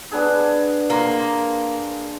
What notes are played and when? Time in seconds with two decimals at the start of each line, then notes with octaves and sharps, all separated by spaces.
0.11 B3 D4 G#4
0.90 A#3 F5 C6